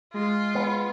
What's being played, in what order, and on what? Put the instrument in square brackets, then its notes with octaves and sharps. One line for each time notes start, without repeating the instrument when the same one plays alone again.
[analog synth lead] G#3 [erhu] F4
[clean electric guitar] B3